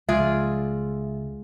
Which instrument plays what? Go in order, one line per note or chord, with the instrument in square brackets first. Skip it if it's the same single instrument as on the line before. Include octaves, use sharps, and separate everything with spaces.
[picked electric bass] C#2 [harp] G#3 [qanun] F4 G#4 D5 [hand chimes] E5